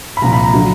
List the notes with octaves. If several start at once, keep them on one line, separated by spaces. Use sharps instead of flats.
B5
C2 A#2 F3 A#5
B5
A#5
D3 F#3